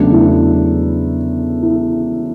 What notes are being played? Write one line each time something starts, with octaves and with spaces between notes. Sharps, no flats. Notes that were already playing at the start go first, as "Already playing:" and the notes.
Already playing: E2 C#3 F#3 A3 D4
E4
E4